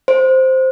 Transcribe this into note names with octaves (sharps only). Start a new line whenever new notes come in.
C5